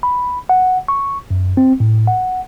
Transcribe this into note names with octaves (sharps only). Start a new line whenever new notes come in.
B5
F#5
C#6
F#2
C4
A2
F#5